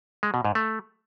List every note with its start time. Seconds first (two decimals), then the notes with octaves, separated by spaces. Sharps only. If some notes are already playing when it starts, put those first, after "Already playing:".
0.23 G#3
0.34 B2
0.45 G#2
0.55 A3